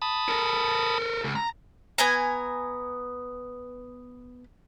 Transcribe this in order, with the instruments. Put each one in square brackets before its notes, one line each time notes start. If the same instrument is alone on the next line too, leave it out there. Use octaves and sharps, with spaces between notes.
[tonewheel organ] A5 B5 D#6
[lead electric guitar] A4 A#4
C#2
A#5
[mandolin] B3 G#5 A#5